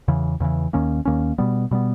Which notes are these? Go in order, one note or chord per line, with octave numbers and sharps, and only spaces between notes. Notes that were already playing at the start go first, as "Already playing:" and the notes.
E2 C#3 E3
E2 C#3 E3
D#2 D#3 A#3 C#4
D#2 D#3 A#3 C#4
B2 G3 B3
B2 G3 B3